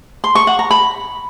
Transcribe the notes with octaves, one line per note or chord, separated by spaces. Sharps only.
C6
C#6
F#5
A#5
B5